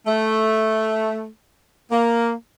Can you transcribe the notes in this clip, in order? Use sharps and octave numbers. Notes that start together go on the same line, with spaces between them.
A3
A#3